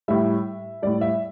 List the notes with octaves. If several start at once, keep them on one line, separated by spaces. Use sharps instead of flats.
A2 G3 E5
A2 G3 D5
E5